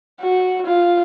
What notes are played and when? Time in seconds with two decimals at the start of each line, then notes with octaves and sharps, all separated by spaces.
0.21 F#4
0.66 F4